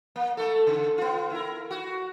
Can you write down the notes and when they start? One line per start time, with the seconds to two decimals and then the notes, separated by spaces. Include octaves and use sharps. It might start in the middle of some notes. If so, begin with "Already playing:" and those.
0.16 A#3
0.37 A3 A4
0.67 C#3
0.98 B3 F4
1.31 E4 A#4
1.71 F#4